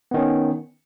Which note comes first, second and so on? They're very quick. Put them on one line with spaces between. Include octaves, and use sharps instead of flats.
B3 D#3 C#4